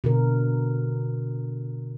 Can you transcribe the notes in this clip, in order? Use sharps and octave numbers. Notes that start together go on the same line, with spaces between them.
B2 D3 A#4